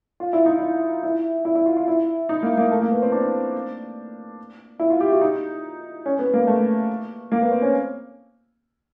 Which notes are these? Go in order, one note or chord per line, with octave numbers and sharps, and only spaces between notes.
F4
E4
D#4
E4
E4
E4
E4
F4
F4
E4
D#4
A#3
A#3
A3
A#3
B3
C4
D4
E4
F4
G4
F#4
D#4
C#4
B3
A#3
A3
A#3
B3
C4
C#4